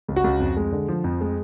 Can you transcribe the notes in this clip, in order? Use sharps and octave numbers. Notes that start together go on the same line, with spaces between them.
C#2
F#4
C#2
F2
G#3
D3
F3
F2
G#3